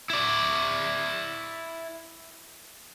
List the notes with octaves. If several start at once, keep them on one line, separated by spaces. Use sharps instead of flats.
E4 D5